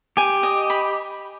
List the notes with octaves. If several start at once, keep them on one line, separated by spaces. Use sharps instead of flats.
G4 G#5
D#5
B5